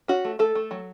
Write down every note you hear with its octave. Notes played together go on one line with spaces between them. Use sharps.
C#4 F#4
A3
A3 A4
A3
F#3